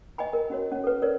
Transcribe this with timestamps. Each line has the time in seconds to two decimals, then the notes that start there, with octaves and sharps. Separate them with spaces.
0.18 D#5 G5 G#5 B5
0.33 A#4
0.50 C#4 F#4 C#5
0.72 C#4
0.84 A4 B4
1.02 A#4 C#5 D5